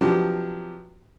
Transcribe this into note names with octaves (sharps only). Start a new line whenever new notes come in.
C3 F3 F#3 B3 D4 G4